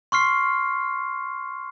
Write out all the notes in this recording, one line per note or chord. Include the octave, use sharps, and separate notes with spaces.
C6 C#6 F6 C7